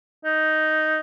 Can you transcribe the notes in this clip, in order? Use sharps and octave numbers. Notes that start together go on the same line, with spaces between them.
D#4